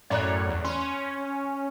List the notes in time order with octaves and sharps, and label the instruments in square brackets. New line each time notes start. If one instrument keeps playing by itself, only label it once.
[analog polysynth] F#2 A2 C#5 [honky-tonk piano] D5 A#5 F#6
[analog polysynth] E2
[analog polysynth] C#4 [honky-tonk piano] C6